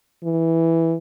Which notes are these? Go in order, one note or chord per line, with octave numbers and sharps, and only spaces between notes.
E3